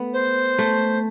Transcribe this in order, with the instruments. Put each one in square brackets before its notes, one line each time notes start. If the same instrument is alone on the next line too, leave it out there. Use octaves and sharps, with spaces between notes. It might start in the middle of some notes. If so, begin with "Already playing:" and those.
Already playing: [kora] A3 B3
[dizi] C5
[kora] A3